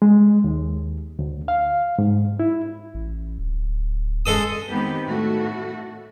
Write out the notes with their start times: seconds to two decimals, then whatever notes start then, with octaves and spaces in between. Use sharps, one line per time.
0.02 G#3
0.44 D#2
1.19 D2
1.48 F5
1.98 G#2
2.39 E4
2.94 A1
3.38 D1
4.26 F#2 G#3 A4 D#6
4.69 D#3 G#3 B3 C4 G4 B4
5.06 A2 D#3 A3 F#4